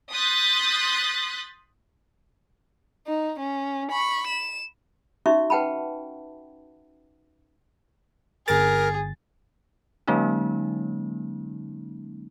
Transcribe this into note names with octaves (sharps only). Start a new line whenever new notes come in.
C6 D#6 F#6 G6 A6 B6
D#4
C#4
B5 C#6
E7
C#4 D#4 F#4 E5 C#6
B4 F#5 G5 A5 B5
G1 G#4 A#4 A6
D3 F#3 G#3 A#3 C#4 D#4